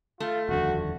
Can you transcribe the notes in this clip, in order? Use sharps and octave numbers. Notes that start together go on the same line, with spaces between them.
A3 F4
D#1 F2 D3 F#4